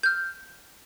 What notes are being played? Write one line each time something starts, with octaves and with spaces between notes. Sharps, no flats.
F6 G6